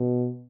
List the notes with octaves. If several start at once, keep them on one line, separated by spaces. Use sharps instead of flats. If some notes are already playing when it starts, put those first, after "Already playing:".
Already playing: B2